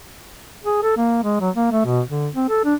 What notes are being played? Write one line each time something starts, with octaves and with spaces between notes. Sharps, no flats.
G#4
A4
A#3
G#3
F#3
A#3
A3
B2
D3
C4
A4
D4